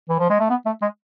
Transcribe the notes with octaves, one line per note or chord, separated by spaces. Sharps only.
E3
F3
G#3
A3
B3
A3
G#3